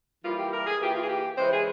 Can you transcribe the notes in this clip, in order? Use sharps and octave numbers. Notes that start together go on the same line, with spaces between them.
E3 G3 A#3 E4 F4
G4
A#4
G#4
E3 A#3 F4 G4
F4
G#4
G4
C#3 E3 G#3 E4 C5
G#4